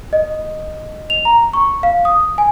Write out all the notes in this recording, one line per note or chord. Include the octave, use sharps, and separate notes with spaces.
D#5
F7
A#5
C#6
F5
D#6
G#5